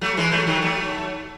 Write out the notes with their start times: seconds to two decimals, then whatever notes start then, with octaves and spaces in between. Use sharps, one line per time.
0.01 F#3 A3
0.17 E3 G#3
0.31 F#3 A3
0.47 D#3 F#3
0.62 F#3 A3